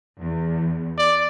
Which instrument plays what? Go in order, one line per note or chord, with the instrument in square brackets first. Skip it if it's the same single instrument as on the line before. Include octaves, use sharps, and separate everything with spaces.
[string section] E2
[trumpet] D5